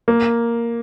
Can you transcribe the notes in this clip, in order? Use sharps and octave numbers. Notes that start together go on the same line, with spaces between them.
A#3